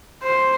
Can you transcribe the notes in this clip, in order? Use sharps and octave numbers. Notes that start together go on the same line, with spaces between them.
C5